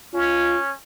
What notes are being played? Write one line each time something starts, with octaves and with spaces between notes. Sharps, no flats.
C#4 F4